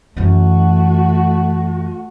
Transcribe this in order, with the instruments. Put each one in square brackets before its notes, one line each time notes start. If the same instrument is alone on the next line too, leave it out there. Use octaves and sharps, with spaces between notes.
[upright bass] F#2 E3 [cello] A3 F#4